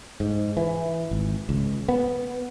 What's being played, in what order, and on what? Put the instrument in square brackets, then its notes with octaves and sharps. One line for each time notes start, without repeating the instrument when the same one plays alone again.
[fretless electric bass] G#2
E3
G#1
C#2
B3